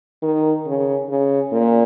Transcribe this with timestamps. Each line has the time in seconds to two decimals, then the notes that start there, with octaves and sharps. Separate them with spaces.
0.22 D#3
0.66 C#3
1.10 C#3
1.53 A#2